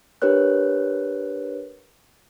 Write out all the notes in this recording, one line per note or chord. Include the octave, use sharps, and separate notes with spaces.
D4 G4 A#4 B4 C#5 F#6